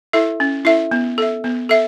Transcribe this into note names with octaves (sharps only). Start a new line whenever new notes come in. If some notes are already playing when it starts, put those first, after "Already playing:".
E4 A4 E5
C#4
E4 A4 E5
B3
A4 E5
B3
A4 E5